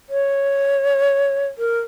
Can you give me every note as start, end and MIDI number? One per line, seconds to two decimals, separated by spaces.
0.10 1.47 73
1.58 1.80 70